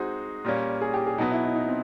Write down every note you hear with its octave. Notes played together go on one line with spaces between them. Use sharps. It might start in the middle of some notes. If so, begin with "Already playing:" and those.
Already playing: G#3 C4 D#4 F#4 G#4 C5
A#2 G3 A#3 C#4
G#4
G4
G#4
B2 F#3 B3 D#4
E4
D#4
D#4
C4